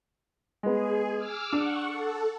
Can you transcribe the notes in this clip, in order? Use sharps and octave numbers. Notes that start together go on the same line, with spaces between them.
G#3 B3 G#4
D6 E6 F6
D4 F#5 C#6
A4